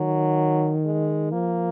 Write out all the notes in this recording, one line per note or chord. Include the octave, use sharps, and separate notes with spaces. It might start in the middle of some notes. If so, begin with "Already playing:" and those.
Already playing: D#3 F#3
G#3
F3 A#3